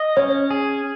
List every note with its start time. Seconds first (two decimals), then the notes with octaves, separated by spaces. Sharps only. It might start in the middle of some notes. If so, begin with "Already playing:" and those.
Already playing: D#5
0.17 C#4 C#5
0.51 G#4